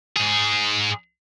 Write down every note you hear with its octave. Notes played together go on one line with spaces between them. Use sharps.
G#2 G#4